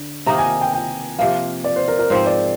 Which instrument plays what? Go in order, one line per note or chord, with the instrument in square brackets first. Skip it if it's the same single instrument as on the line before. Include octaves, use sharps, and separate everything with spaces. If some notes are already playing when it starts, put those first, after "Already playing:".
Already playing: [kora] D3
[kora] C3 D#3 A#3 D#4 [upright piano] A#5
[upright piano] G#5
G5
G5
[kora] C3 F3 A#3 [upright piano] F5
[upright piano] D5
C5
A#4
A#4
[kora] G#2 F3 C4 [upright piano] C5
[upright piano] D5